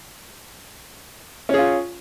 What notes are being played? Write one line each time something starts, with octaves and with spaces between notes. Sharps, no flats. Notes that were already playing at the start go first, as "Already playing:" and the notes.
C#4 F4 G#4